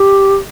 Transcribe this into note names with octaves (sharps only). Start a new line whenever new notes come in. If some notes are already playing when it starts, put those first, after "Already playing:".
Already playing: G4